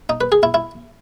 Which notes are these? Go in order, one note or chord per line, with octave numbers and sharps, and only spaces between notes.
D#4
B4
G#4
E4
E4